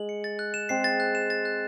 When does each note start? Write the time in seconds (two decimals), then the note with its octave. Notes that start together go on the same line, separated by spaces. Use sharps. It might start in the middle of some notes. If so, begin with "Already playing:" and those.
Already playing: G#3 F#7
0.09 C#7
0.24 A6
0.39 F#6
0.54 E7
0.69 G#3 C4 C7
0.84 A6
1.00 F#6
1.15 E7
1.30 A6
1.45 F#6